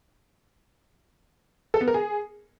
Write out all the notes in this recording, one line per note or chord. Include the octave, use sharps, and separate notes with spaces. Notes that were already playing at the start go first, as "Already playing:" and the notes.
A4
B3
A#4
G#4